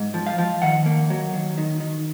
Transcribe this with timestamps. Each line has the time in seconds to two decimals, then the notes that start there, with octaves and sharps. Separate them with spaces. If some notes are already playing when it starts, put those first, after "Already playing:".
Already playing: G#2
0.14 F3
0.26 F5
0.38 F3
0.62 D#3 F#5
0.86 A#3
1.10 F#3
1.34 D#3
1.58 D#3
1.80 D#3